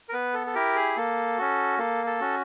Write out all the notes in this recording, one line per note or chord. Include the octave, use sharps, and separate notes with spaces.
A#4
B3 B4
A4
A4
E4 G4 A#4
G#4
A#3 A4
C#4 F#4
A#3 A4
A4
C#4 F#4